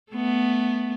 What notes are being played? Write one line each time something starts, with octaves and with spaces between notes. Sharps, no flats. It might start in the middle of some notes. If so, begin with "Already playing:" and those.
A3 B3